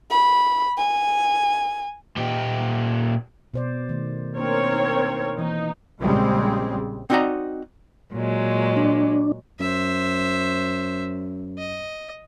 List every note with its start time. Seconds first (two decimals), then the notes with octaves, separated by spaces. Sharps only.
0.11 B5
0.78 G#5
2.17 A#2 G4
3.54 B2 C5 D5
3.89 D#3 A3
4.37 A#3 C4 D4 A#4 C#5
4.73 D#4
5.39 E3 A#3 D#4
6.00 A#1 C#3 G3 G#3 C4
7.10 C4 D#4 F#4 D5 D#5 A#5
8.13 A#2 F#3 G#3
8.77 D4
9.60 F#2 C5 E5
11.58 D#5